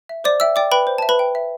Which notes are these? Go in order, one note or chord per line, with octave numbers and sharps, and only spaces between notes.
E5
C5 D5 D6
E5 G5 E6
D5 G5 D6
B4 G5 B5
C5
A5
E5
B4 B5
G5
E5